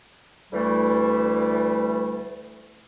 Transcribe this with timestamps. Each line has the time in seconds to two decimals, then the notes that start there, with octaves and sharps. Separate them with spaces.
0.53 D2 E3 G3 A3